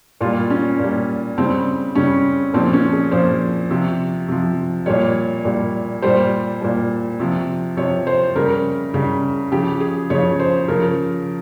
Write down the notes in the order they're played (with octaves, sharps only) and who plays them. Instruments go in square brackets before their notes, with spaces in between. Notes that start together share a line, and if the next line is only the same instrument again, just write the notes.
[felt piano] A#2 G3 F4
C#4
A#2 G3
C#3 G3 C4
C#3 G3 C#4
A#2 C4
F3
C#4
G#4
A#2 F3 C5
C3 F3
C3 F3
A#2 G3 C#5
A#2 G3
A#2 G3 C5
A#2 G3
C3 F3
C3 F3 C#5
C5
C#3 G3 A#4
C#3 G3
C#3 F3 G4
G#4
C#3 F3 C#5
C5
C#3 F3 A#4